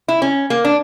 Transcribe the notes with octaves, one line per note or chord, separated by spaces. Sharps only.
E4
C#4
A#3
D4